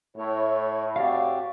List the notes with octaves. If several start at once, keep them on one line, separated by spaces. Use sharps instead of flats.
A2 E4 C#5
C4 F#4 G4 D5 F5